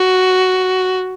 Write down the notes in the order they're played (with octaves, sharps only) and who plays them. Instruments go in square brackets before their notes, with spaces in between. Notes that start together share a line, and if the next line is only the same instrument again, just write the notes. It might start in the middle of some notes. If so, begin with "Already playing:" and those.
Already playing: [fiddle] F#4